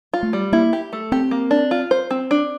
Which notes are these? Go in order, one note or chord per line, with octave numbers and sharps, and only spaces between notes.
F4
A3
G3
A#3 E4
G4
A3
C4 G4
A#3
D4
F4
C5
C4
D4